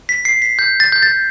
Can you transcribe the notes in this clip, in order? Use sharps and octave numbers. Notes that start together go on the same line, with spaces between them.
B6
C7
B6
G6
A6
G6
A6